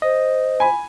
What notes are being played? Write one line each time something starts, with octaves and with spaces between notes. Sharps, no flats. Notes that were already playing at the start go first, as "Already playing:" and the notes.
C5 D#5
G#5 B5